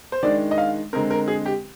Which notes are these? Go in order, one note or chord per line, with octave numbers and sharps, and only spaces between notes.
C5
D#3 G#3 D4 D5
D#5
F5
D3 G#3 C4 A#4
A#4
G#4
G4